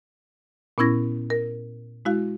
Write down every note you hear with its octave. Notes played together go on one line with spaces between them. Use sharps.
A#2 B3 C#4 E4 G#6 A#6
A#4
G#3 E4 F#4 F5